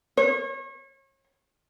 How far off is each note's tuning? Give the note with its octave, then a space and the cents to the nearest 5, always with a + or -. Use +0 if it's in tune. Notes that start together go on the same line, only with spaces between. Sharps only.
C#5 -35